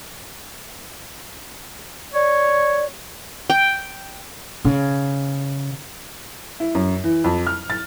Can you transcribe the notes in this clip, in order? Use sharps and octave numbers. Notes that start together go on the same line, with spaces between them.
C#5 D5
G5
C#3
E4
F#2
E3
F2
F6
A6